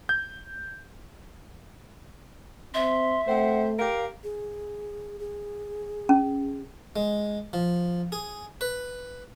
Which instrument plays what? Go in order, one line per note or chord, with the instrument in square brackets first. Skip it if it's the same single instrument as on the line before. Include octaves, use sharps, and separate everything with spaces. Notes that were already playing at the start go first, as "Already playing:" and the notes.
[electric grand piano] G6
[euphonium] C4 [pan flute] E5 [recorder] C6
[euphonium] A3 [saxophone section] C4 C5 [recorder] F#5
[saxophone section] G4 A#4 [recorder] F5
[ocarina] G#4
G#4
[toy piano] C#4
[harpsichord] G#3
F3
G#4
B4